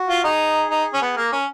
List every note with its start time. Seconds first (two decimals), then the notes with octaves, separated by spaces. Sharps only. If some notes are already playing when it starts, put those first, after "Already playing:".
Already playing: F#4
0.09 F4
0.24 D#4 G#4
0.70 D#4
0.93 C#4
1.01 B3
1.16 A#3 A#4
1.32 C#4 A#4